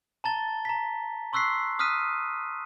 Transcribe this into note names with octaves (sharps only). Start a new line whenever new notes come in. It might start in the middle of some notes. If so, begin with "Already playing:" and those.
A5 A#5 A6 G7
A#5 B6
C6 C#6 E6 F#6 B6 C7
D#6 F6 F#6 B6 D#7